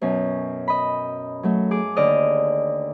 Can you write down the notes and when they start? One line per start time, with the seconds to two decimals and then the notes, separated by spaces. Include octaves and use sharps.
0.01 F#2 B2 C#4
0.68 D#5 B5
1.43 F#3 A3
1.71 G#4 D6
1.96 D#2 D3 D5 D#5 F6